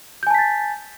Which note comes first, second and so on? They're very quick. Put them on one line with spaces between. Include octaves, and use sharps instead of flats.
G6 G#5 A5 B6 A6